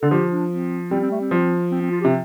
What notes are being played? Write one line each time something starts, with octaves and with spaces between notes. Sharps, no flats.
D3 A4
F3 G4
D4
C4
G3 C4
C4
A3
C4
F3
C4
C4
F4
G4
C3